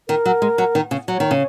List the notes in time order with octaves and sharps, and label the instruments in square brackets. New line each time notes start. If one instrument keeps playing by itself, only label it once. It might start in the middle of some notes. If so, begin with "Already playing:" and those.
[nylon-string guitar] D#3 [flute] A#4
[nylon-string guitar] F#3
G#3
F#3
D#3
C#3
[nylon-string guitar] F#3 [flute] C#5
[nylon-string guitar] D#3
C#3